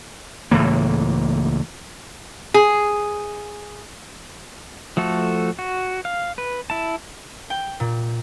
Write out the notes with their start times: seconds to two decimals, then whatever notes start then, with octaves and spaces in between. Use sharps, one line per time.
0.51 C#2 A2 E3 A#3
2.54 G#4
4.97 F3 A3 F#4 A4
5.59 F#4
6.05 F5
6.38 B4
6.70 E4 A5
7.50 G5
7.80 A#2